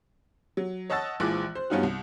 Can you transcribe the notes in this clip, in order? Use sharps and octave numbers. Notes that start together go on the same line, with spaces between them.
F#3
C#5 D#5 F#5 A5 E6 A6
A#1 E3 F3 G#3 D6 F#6
C5
G2 B3 C#4 D#4 F4 F#4
C2